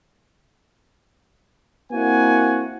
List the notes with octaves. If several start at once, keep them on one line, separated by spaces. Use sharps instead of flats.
A#3 C4 E4 F#4 F#5 G#5